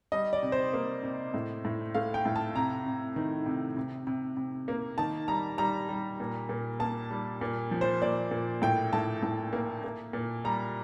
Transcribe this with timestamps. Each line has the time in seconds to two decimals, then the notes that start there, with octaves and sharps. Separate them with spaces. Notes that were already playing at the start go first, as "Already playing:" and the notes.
0.12 G3 D#5
0.33 D5
0.43 C3
0.52 C5
0.73 A#3
1.03 C3
1.34 A2
1.65 A2
1.94 A3 F5
2.14 G5
2.25 A2
2.36 A5
2.55 C3 A#5
2.86 C3
3.16 D#3
3.46 C3
3.77 C3
4.07 C3
4.37 C3
4.68 A#3
4.98 D#3 A5
5.28 G3 A#5
5.58 G3 A#5
5.89 G3
6.20 A#2
6.49 A#2
6.80 A#3 A5
7.11 G3
7.41 A#2
7.71 F3
7.81 C5
8.02 A#2 D5
8.31 A#2
8.62 A2 G5
8.93 A2 A5
9.23 A2
9.53 A#3
9.84 A#3
10.13 A#2
10.44 G3 A#5